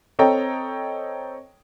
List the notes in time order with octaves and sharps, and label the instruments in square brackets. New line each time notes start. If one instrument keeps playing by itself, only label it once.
[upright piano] C4 A4 C#5 D#5 G5 A#5